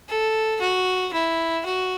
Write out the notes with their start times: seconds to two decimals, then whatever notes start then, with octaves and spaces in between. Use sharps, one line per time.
0.09 A4
0.61 F#4
1.13 E4
1.65 F#4